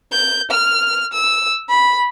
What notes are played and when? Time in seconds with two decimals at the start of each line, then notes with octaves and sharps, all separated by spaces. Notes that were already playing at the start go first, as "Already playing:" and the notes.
0.12 G6
0.51 F6
1.13 E6
1.69 B5